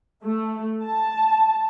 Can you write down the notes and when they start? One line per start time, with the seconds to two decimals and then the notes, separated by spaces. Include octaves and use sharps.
0.23 A3
0.84 A5